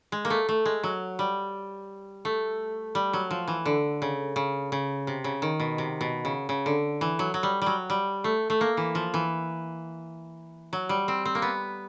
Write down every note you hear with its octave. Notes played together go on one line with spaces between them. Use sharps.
G#3
A#3
A3
A3
G#3
F#3
G3
A3
G3
F#3
F3
E3
D3
C#3
C#3
C#3
C3
C#3
D#3
B2
C3
B2
C#3
C#3
D3
E3
F#3
F#3
G3
F#3 G3
G3
A3
A3
A#3
E3
F3
E3
F#3
G3
C4
C4
A#3
B3